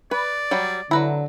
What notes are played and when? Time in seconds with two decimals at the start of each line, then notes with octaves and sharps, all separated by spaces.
0.11 B4 D5
0.51 F#3 G3
0.91 D3 F#3 E4 B4 A#5